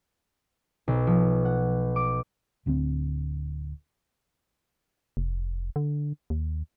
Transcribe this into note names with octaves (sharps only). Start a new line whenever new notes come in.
B1
F3
F#5
D6
D1 D2 A3 C4
F1
D3
D#2